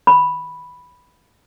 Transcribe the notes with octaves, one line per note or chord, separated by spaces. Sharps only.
B5